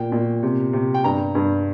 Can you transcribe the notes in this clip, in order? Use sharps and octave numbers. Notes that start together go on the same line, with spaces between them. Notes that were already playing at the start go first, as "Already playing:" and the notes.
Already playing: A#2 G5
A#2
C3
C3
G5
G2 A#5
G2